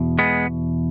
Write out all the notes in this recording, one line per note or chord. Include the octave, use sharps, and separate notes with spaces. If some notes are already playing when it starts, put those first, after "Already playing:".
Already playing: E2 B2
G#3 B3